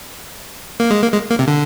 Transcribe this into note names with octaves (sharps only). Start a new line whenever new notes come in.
A#3
G#3
A#3
G#3
A#3
C3
D3